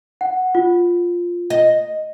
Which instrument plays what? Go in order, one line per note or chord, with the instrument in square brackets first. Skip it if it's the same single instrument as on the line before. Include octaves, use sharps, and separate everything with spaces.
[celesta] F#5
F4
[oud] D#5